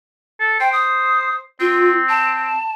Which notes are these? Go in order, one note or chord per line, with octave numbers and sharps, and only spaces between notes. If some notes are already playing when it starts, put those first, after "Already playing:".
A4
C5 G5
D#6
C4 F4
A5